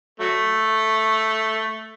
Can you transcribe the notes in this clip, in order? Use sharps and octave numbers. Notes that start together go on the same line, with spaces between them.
F#3 A3